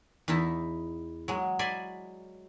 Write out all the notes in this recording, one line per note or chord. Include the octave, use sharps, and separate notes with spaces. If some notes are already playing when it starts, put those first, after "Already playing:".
E2 D#4 E4 A5
F#3 G#3
D5 E5 G#5 B5 C6